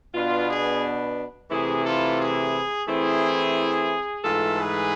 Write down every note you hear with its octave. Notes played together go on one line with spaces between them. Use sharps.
B2 B3 D4 F4
G#4
C3 E3 A3 E4 G#4
F4 A4
G#4
E3 A3 C4 E4 G#4
G#2 E3 A3 F4 A4
G#4 B4